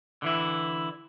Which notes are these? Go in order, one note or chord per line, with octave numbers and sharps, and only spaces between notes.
D3 E3 E4